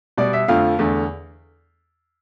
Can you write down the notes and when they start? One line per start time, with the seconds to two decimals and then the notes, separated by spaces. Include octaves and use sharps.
0.18 B2 G3 D5
0.33 E5
0.48 F2 D3 F3 A3 F5
0.79 E2 D3 A3